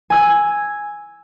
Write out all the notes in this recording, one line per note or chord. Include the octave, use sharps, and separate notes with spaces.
G#5 E6 G#6